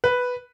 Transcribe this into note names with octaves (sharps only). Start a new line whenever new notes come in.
B4